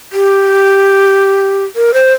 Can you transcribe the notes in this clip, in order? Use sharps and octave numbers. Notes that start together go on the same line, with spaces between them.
G4
A#4
C5